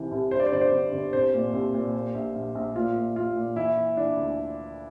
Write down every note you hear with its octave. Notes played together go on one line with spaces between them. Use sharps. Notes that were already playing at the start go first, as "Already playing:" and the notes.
Already playing: C2 C3 E3
C2
G2 C5
D5
C5
G1 D5
C5
G1
G1
C2 C5
A#2
C2
A#2
A#2
A#1
A#1
A#1
A#2 F4
A#2
A#2 F4
A#2
E3 E4
E3
E3 D4
D2